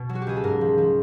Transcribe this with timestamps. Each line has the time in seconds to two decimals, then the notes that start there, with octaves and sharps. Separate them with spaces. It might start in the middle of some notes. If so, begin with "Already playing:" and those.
Already playing: B2
0.09 F#3
0.15 F#4
0.22 G4
0.27 C#2 G#4
0.37 A4
0.44 G#2 A#4
0.61 F3
0.78 F3